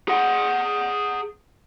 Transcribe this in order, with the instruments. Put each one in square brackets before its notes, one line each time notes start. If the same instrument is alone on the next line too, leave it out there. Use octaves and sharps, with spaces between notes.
[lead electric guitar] G#4 F#5